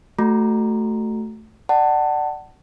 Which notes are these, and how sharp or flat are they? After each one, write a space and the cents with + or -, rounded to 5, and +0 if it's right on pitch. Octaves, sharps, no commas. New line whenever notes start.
A3 +0 F#4 +0 A#5 +0
D5 +25 F#5 +25 A5 +15